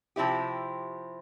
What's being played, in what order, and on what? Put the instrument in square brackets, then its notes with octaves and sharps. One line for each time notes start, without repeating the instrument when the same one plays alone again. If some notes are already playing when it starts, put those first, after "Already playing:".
[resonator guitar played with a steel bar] C3 F3 C4 E4 G4